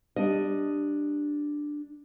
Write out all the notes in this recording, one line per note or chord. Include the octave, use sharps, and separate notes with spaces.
G3 D4 D5 D#5